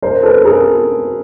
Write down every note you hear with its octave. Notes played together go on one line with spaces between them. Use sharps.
A#4 C5
A4 B4
G#4 A#4